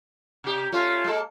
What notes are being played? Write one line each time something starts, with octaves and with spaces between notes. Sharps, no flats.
C3 G4
A3 C#4 F4
G#3 A#3 A4